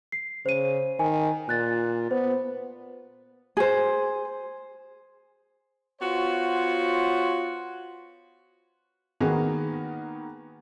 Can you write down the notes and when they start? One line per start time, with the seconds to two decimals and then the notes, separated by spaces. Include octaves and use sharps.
0.12 C7
0.46 C#3 C5 D#7
0.99 D#3 G#5
1.49 A#2 F#6 A6
2.11 B3 C5
3.57 G#4 C5
6.01 B3 F4 F#4 C5 C#5
9.20 D#3 A#3 B3 D#4 F#4 G#4